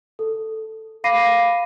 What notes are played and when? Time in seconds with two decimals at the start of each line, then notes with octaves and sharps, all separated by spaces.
0.19 A4
1.04 F5 B5 D6 A#6 C7 D#7